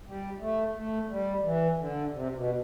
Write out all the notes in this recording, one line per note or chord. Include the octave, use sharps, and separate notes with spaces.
G3
A3
A3
G3
E3
D3
C3
B2